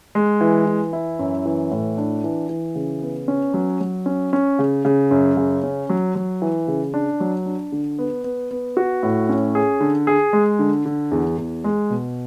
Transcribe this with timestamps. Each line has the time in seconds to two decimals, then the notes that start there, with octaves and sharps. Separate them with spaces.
0.15 G#3
0.41 E3
0.66 E3
0.93 E4
1.19 F#2
1.45 E3
1.71 A2
1.98 D4
2.24 E3
2.49 E3
2.75 C#3
3.02 B3
3.28 C#4
3.54 F#3
3.80 F#3
4.06 C#4
4.33 C#4
4.59 C#3
4.85 C#3
5.11 F#2
5.37 C#3
5.63 C#4
5.89 F#3
6.15 F#3
6.42 E3
6.68 C#3
6.94 D4
7.20 F#3
7.46 D4
7.72 D3
7.99 B3
8.24 B3
8.51 B3
8.77 F#4
9.03 A2
9.29 C#4
9.55 G#4
9.80 D3
10.07 G#4
10.33 G#3
10.59 D3
10.86 D3
11.12 E2
11.38 E2
11.64 G#3
11.90 B2